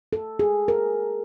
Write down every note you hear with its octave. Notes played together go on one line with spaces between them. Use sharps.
A4
G#4
A#4